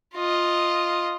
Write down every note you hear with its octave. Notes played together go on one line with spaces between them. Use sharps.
F4 D#5